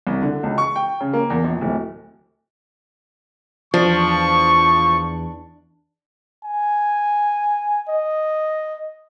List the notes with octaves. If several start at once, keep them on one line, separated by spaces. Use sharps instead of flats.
C2
D3
C#2
C#6
G5
C#3
A#3
E2
A#1
D1
E2 F3 D4 C#6
G#5
D#5